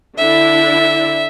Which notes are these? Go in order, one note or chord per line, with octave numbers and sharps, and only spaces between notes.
D3 D4 E4 E5